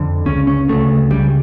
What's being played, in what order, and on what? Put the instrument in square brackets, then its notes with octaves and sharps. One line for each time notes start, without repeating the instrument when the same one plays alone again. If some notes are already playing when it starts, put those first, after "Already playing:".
Already playing: [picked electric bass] F2 D3
C#2 C#3 C#4
C#4
D2 C#3 A3
C#2 C#3 G3